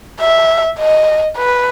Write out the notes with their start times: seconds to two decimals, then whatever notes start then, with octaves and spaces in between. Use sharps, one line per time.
0.20 E5
0.79 D#5
1.37 B4